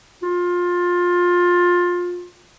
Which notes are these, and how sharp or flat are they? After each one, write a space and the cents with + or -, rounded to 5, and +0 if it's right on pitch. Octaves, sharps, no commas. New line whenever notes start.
F4 +20